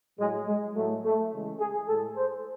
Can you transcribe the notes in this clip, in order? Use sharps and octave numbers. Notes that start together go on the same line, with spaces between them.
A2 F#3 G#3
G#3
A2 F#3 A3
A3
C#3 E3 G#3
G#4
A2 G#3 A4
C5